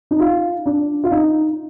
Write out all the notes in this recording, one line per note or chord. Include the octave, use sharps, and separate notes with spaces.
D#4
F4
D4
F4
D#4